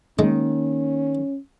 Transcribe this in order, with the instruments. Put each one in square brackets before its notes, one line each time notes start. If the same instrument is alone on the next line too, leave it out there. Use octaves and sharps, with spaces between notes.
[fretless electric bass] D#3 [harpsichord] G#3 [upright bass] A#3 [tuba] C#4